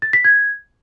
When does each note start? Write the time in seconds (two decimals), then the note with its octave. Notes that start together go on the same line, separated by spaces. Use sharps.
0.02 A6
0.13 B6
0.24 G#6